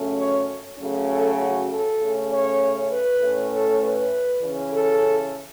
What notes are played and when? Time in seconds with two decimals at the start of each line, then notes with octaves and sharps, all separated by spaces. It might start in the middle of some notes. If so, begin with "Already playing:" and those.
Already playing: F#2 C#3 A3 C#4
0.17 C#5
0.78 C#3 F#3 A3 C#4
1.08 A4
1.38 F#4
1.69 A4
1.99 C#3 A3 C#4
2.30 C#5
2.90 B4
3.20 A2 A3 C#4
3.50 A4
3.81 B4
4.42 C#3 E3 C#4
4.72 A4